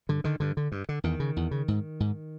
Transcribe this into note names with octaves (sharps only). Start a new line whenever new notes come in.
G2 D3
D3 D#3
G2 D3
D3
G2
D3
E2 D#3
C#3
E2
C#3
G#2
G#2